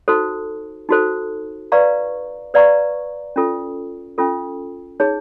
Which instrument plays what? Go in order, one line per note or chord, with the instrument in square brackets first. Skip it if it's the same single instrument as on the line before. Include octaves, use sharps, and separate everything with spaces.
[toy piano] D#4 F#4 A4 C5
D#4 F#4 A4 C5
B4 D5 F5 A#5 C#6
B4 D5 F5 A#5 C#6
C#4 F4 A4
C#4 F4 A4
D#4 G#4 C#5